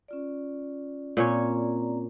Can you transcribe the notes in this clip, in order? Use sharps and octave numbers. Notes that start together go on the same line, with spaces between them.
C#4 F4 D5
A#2 C4 C#4 C#5 D5 A#5